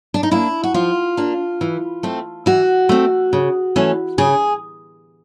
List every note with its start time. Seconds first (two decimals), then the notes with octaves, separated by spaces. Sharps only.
0.14 D4
0.23 D#4
0.31 A#3 D4 E4
0.64 F#4
0.74 F3 F4
1.17 A#3 D4
1.61 E3
2.03 A3 C4
2.46 E3 F#4
2.89 A3 C4
3.33 C#3
3.76 E3 A3 C#4
4.18 C#3 G#4